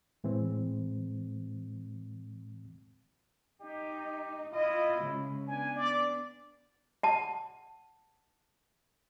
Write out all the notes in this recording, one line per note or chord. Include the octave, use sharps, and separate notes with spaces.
A2 E3 G#3 C4
D#4 G4
E4 F4 D#5
C#3 G#3
B3 D4 G#5
D5
F#5 A5